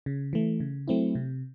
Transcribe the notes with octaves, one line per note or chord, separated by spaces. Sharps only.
C#3
E3 A3
C#3
F#3 A3 C4 E4
C3